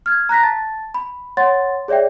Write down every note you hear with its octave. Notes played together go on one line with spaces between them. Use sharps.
F6 G#6
A#5 F#6 A#6 B6
A5 A6
B5
C#5 F#5 C6 A6
G#4 C#5 D5 E5 G5